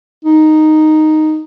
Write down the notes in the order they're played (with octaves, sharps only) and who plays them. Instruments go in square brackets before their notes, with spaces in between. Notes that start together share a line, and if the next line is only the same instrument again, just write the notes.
[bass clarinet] D#4